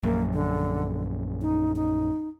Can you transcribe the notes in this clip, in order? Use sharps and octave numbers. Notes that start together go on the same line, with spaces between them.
A#1 F#2 A#3
D3
D#4
D#4